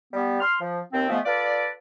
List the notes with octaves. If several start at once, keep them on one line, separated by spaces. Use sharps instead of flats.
G3 B3
C6 F6
F3
D#2 C4
F3 G#3 A3 B3
F4 A4 B4 D5